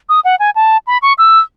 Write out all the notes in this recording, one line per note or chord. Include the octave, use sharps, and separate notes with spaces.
D#6
F#5
G#5
A5
B5
C#6
E6